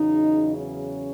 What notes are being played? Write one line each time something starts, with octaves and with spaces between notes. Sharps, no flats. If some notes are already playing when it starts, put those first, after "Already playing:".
Already playing: E2 C#3 F#3 D#4
C#4